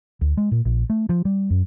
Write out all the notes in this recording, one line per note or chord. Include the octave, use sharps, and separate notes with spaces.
D2
G#3
A#2
A#1
A3
F3
G3
F#2